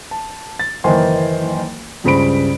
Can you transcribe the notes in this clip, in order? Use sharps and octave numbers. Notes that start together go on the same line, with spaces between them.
A5
A6
F#1 D#3 E3 C5 G#5 C6
C#2 G2 C#3 C5 B5 D7